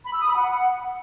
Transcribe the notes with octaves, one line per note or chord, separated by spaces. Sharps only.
B5
E6
D#6
B5
F#5